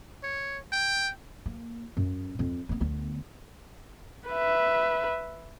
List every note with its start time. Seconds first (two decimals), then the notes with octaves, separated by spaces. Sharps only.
0.23 C#5
0.72 G5
1.46 A#3
1.97 F#2
2.39 F2
2.69 A#3 B3
2.81 D2 B3
4.29 B4 E5